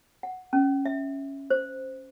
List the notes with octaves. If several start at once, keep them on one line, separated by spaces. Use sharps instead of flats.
F#5
C#4
E5
C5